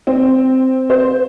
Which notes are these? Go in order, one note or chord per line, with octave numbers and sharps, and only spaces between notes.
C4
C5